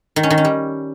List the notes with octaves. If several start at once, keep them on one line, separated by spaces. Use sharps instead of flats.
D#3
C#4
D#3
C#4
G3